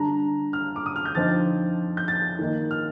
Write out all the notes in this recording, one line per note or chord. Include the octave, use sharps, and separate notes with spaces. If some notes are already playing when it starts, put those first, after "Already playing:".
Already playing: D3 G3 D4 A#5
F6
D6
D#6
F6
G6
D3 F3 C4 D#4 A6
G6
A6
D#3 A#3 D#4
F6